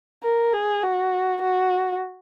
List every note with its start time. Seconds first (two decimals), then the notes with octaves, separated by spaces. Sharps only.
0.23 A#4
0.53 G#4
0.83 F#4
1.42 F#4